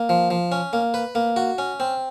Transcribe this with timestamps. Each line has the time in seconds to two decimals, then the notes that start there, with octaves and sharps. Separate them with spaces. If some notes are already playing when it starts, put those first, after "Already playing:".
Already playing: A#3
0.09 F3
0.30 F3
0.52 C#4
0.73 A#3
0.94 B4
1.15 A#3
1.36 F#4
1.58 C#4
1.80 C4